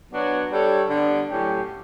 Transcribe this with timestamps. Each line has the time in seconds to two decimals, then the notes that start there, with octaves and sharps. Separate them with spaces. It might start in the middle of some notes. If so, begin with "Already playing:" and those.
0.12 F#3 B3 D4 F#4 C#5
0.51 G3 D4 A4 C#5
0.90 D3 G3 B3
1.30 A2 F#3 C#4 G4